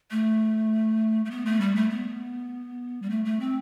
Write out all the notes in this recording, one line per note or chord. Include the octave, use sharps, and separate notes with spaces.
A3
A3
B3
A3
G3
A3
B3
G3
A3
A3
C4